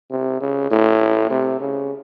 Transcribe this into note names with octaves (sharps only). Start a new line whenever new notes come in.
C3
C#3
A2
C3
C#3